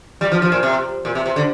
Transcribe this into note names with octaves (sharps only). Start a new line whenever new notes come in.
G3
F3
F3
A#2
C3
A#2
C3
C3
D3